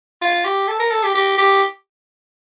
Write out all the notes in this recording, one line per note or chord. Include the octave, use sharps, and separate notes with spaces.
F4
G4
A4
A#4
A4
G4
G4
G4